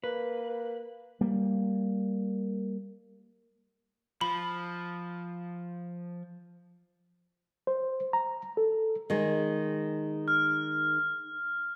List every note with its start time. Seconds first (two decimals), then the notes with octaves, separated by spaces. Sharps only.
0.04 A#3 B4
1.21 G3 A#3
4.21 F3 B5
7.67 C5
8.13 A#5
8.57 A4
9.10 D#3 G#3
10.28 F6